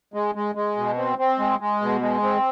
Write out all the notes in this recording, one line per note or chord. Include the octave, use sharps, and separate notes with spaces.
G#3
G#3
G#3
B2
C4
C4
G#3
G#3
B2
G#3
C4